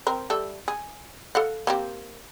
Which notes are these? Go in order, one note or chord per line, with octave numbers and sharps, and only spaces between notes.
C4 A#4
G3 A3 A4
G#4
A4 F5 F#5
A#3 C4 G4